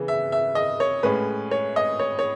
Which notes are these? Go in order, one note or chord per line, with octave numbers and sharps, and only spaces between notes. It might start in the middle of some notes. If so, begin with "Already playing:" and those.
Already playing: C#3 E3 B3
E5
E5
D#5
C#5
A2 G#3 C#4 B4
C#5
D#5
C#5
C#5